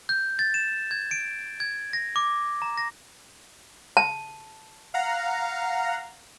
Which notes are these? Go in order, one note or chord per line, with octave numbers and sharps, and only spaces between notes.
G6
A6
E7
G#6
D7
G#6
A#6
D6
A#5
A#6
A5
F5 F#5 A#5